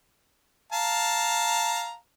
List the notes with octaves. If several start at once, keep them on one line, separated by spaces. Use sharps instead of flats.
F5 A5 A#5